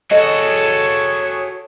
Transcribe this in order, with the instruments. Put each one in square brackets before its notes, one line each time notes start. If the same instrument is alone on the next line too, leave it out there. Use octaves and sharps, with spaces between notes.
[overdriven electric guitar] F#4 G#4 [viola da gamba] A4 [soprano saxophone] C#5 [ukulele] D#5